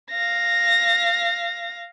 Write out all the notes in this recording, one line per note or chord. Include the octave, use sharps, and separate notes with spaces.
F5 A#6